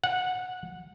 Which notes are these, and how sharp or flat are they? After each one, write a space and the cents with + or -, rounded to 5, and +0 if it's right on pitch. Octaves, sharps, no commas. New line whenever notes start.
F#5 -15